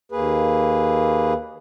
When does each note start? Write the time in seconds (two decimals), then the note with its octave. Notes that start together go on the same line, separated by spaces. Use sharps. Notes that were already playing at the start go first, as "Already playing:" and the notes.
0.12 D#2 A#3 G#4 B4